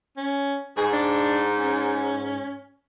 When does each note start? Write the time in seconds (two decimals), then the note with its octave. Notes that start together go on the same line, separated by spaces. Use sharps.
0.17 C#4
0.77 G#2 G#4
0.92 D4
1.57 C#4